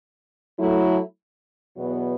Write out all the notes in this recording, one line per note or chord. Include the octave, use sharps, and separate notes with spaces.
F#3 A3 E4
E2 B2 F#3 B3